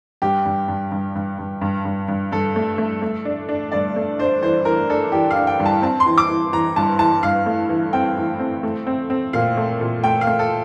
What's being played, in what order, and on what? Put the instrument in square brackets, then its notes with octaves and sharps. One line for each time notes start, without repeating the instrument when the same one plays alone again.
[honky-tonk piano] G2 [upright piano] G4
[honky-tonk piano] G2
G2
G2
G2
G2
G2
G2
G2
[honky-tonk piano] G2 [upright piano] A4
[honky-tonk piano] A3
A3
A3
D4
D4
[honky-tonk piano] G2 [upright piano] D5
[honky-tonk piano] A3
[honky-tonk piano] D4 [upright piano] C5
[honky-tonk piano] E3 [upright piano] C5
[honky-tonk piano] E3 [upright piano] A#4
[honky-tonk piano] D4 [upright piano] A4
[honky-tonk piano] E3 [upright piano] G4
[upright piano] F5
[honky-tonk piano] D4
[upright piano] G5
[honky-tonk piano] G2
[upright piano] A5
[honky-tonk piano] C4 [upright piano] A5
[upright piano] C6
[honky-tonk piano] E3
[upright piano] D6
[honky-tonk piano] E3
[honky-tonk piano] E3 [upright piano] A#5
[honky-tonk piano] G2 [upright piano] A5
[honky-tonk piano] E3 [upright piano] A5
[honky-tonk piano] G2 [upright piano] F5
[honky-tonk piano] A3
E3
[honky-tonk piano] C4 [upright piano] G5
[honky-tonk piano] E3
C4
A3
C4
C4
[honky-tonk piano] A#2 [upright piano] F5
[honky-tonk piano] A3
A#2
[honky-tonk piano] A3 [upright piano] G5
[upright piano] F5
[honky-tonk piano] A3
[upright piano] A4